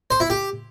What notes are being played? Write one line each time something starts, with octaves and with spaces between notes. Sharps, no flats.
C5
E4
G4